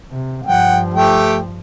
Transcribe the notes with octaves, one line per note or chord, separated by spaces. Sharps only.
C3
G2 F3 F#5 G5
A3 G4 G5